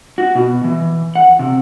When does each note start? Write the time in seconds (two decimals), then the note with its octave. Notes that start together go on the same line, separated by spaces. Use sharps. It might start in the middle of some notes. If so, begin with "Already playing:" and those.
0.18 F#4
0.35 B2
0.64 E3
1.15 F#5
1.39 C3